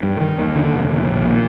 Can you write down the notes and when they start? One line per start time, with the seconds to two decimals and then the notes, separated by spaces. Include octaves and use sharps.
0.03 G2
0.20 D#3
0.38 D#2
0.55 D3
0.73 F1
0.89 D#2
1.07 A#1
1.25 A#2